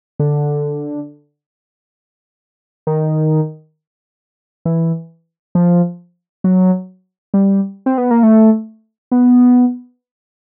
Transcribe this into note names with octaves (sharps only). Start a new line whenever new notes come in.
D3
D#3
E3
F3
F#3
G3
C4
B3
A#3
A3
B3